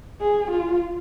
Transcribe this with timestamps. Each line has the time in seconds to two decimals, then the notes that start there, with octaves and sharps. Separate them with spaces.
0.21 G#4
0.51 F4